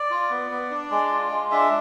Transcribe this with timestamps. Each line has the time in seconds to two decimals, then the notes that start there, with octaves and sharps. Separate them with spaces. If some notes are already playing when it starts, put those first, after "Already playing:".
Already playing: D5
0.11 F4
0.30 B3
0.51 B3
0.70 D4
0.91 G#3
1.11 F4
1.31 G#3
1.51 D4 E5